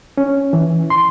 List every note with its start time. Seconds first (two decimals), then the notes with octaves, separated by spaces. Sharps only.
0.18 C#4
0.53 E3
0.90 C6